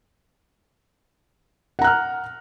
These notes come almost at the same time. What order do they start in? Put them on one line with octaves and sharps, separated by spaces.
F#5 A#5 F#6 F6